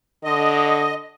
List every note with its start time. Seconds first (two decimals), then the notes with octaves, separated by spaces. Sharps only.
0.24 D3 D#5